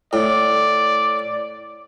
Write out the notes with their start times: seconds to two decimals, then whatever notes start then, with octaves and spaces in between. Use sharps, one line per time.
0.13 A2 D5